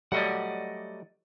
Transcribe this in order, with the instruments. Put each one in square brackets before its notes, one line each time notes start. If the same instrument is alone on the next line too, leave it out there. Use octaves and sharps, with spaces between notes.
[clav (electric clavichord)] F#3 G3 A3 [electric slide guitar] D5 D#5 F#5